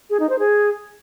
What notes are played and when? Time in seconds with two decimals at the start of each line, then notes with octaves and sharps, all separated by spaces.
0.10 G#4
0.20 D#4
0.29 C5
0.39 G#4